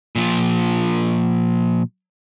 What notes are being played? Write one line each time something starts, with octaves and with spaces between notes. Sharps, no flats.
A#2 F3